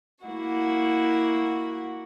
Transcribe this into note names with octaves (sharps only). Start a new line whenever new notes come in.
A#3 E4 F#4 F#5